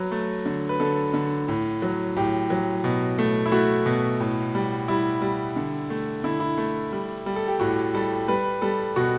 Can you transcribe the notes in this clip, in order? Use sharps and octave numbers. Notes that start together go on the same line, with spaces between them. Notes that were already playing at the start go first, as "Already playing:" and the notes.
Already playing: F#3 B4
A3
D3
B4
D3 A4
D3
A2
F#3
A2 G4
F#3
B2
A3
E4
A3 F#4
B2
A2
G3
G3 E4
G3
D3
A3
D3 E4
E4
A3
G3
G3
A4
G4
A2 F#4
G3 A4
G3 B4
G3 A4
B2 F#4